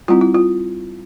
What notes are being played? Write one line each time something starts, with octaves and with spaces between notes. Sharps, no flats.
G3 C4 E4 F4
E4
F4